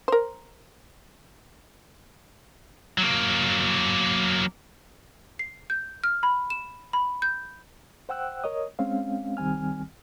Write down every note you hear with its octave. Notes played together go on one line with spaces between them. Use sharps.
A#4 C5
F#3 A#3
C7
G6
F6
B5
E7
B5
G6
C5 F#5 G5 E6 F#6
A#4 C#5 D#5 D#6
G#3 C4 C#4 F5
C2 D#3 G3 C4 G#5 F6